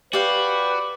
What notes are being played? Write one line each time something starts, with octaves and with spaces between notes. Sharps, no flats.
F#4 G4 B4 D5 F5